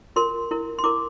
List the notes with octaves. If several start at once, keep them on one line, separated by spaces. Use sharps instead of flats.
F4 A#4 C6
E4 A#4
C6
E4 A#4 D6